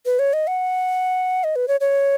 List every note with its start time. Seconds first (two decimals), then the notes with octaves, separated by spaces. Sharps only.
0.06 B4
0.19 C#5
0.33 D#5
0.47 F#5
1.44 D#5
1.56 B4
1.68 C#5
1.80 C#5